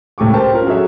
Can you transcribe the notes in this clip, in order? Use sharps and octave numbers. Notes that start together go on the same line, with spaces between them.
C#2 A2 G4 C#6 D6
G4 A#4 C5 A5
C#4 F4 A#4
F#3 F#4 G#4 A4 C#5 E5